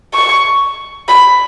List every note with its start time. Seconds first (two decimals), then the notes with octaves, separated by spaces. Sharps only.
0.14 C#6
1.08 B5